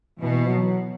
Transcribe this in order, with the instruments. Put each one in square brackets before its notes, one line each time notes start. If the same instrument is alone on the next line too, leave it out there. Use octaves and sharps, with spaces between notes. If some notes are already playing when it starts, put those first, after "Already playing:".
[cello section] B2 [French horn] E3
[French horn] F#3